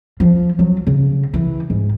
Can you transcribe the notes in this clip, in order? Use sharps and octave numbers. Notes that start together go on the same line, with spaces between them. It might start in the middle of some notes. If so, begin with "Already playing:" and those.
F3
F#3
C#3
E3
G#2